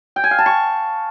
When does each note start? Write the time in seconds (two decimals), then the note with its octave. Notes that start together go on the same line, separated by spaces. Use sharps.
0.16 G5
0.24 G#5
0.31 F5
0.38 A5
0.46 C#6